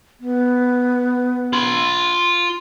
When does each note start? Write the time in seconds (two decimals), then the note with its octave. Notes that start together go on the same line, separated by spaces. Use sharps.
0.20 B3
1.53 F4 B5